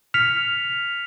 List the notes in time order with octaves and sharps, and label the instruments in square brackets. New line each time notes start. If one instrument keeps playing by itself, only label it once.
[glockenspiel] F6 B6 C#7 F7